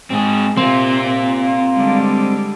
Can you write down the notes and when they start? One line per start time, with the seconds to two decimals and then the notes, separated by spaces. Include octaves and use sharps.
0.10 G#2 C4 G#4
0.57 C3 A#3 C4 F4
1.74 D3 G3 G#3